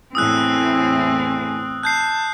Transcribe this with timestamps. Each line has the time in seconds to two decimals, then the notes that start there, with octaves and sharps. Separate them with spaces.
0.15 E2 A2 C4 E4 G#5 D#6 E6 F#6
1.83 A5 F#6 G6 C7